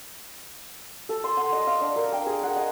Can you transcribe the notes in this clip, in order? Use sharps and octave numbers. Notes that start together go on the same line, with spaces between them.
A4
C6
F#5
D#5
F5
D4
A#4
G5
G#4
F#5
D#5